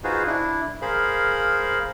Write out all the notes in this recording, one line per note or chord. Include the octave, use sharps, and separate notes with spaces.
D#4 F4 F#4 G#4 B4 C5
D4 E4
G#4 A#4 C5 F5 B5